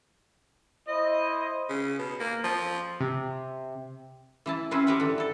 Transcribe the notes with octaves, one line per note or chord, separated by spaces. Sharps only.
E4 C5 D#5
C#3
B2
A#3
F3
C3
E3 E4 A5
C4 C#4 E4 F#4 B4 C5
G4 A#4 B4 E5 F#5
D3 E3
E4 A4